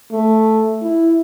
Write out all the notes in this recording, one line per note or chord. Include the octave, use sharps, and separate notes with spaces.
A3
E4